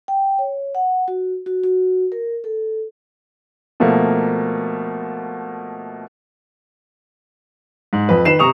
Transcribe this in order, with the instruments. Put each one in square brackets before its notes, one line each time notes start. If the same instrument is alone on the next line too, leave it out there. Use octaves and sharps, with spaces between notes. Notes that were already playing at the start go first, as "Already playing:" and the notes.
[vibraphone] G5
C#5
F#5
F#4
F#4
F#4
A#4
A4
[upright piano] B2 F3 A3 A#3
G#2
F2 B4
D#3 B4 C7 E7
C3 A#5 C#6 D#6 F7